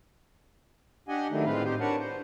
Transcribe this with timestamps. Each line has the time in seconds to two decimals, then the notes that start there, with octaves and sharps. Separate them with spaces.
1.08 D4 G4 D#5 F#5 G#5
1.31 D#3 F#3 G3 A3 D4 D#4
1.45 A2 G#3 C4 F4 B4 F5
1.64 C4 D#4 G4 C5
1.80 D4 A#4 B4 C#5 F#5 A5
2.00 C5